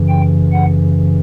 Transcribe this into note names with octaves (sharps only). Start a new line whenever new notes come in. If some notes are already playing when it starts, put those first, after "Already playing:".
Already playing: F#2 C#3 E3
G5
F#5